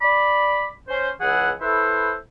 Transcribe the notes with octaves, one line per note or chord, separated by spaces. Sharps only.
D5 B5
C#4 C5
C#2 E3 G#4 F#5
E4 A4 B4 C5 E5